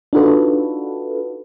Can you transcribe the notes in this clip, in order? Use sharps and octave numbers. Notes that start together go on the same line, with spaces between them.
D4 D#4 F4 F#4 A4 B4